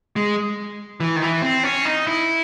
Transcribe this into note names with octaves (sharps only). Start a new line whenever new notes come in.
G#3
E3
D#3
E3
C4
C#4
D#4
E4